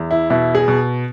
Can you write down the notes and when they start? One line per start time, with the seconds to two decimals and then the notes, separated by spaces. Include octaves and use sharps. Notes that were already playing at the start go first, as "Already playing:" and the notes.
Already playing: E2
0.11 E4
0.30 B2 E4
0.55 G#4
0.68 B2